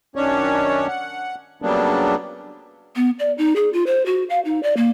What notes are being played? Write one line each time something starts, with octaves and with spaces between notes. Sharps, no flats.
F#2 D#3 C#4 D4 C#5
F#5
C#3 F#3 G3 A#3 B3 D4
B3
D5
D#4
G#4
F4
C5
F#4
F5
D#4
D5
A#3